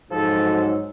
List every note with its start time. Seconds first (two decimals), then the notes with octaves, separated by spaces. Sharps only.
0.11 G#2 F3 F#3 A4